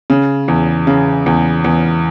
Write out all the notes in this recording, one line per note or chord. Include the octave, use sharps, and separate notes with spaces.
C#3
E2
C#3
E2
E2